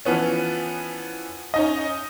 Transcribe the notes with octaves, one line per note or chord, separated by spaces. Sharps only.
E3 F3 B3 C#4
C#4 D#4 D#5